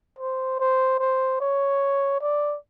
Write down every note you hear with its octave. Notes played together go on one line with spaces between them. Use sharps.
C5
C5
C5
C#5
D5